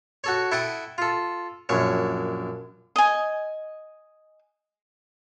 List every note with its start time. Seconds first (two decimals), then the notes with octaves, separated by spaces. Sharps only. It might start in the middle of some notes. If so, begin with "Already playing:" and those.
0.24 F#4 A4 C#5
0.52 E4 A4 F#5 G5 A5 D#6
0.98 F4 A4
1.69 A#1 F#2 C#5
2.96 D#5 G#5